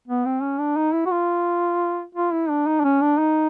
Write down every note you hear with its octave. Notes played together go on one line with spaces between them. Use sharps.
B3
C4
C#4
D4
D#4
E4
F#4
F4
F4
E4
D4
D#4
D4
C#4
D4
D#4